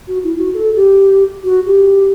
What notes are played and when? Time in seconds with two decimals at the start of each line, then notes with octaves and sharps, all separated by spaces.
0.08 F#4
0.24 E4
0.38 F#4
0.54 A4
0.76 G4
1.44 F#4
1.66 G4